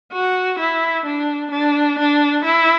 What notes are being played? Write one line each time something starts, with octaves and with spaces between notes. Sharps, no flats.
F#4
E4
D4
D4
D4
E4